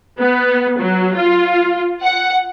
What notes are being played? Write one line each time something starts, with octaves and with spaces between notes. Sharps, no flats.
B3
F#3
F4
F#5